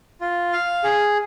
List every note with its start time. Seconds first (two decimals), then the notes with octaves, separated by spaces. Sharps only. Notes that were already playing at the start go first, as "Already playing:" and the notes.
0.21 F4
0.53 F5
0.84 G#4